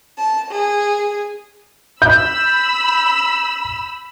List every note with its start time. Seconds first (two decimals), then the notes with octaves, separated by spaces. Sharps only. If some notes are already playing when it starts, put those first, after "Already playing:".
0.17 A5
0.52 G#4
2.02 B5 E6 G6